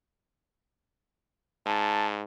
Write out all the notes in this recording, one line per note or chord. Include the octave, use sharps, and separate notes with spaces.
G#2 A5